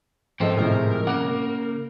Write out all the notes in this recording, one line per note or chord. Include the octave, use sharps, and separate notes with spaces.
G#2 D3 F3 C4 A4 D#5 G5
A2 C3 G#3 A#4
C#3 A#3 F#5 D6